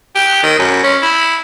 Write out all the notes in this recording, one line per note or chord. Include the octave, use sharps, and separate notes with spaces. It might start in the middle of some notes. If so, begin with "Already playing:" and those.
G4
D#3
F#2
C#4
E4